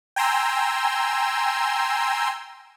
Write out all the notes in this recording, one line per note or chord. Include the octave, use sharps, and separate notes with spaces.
G5 G#5 A#5 C6 E6